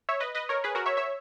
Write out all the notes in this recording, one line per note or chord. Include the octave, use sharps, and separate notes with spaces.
C#5 E5
B4 D#5
B4 D#5
A#4 C#5
G#4 B4
F#4 A#4
C#5 E5
C#5 E5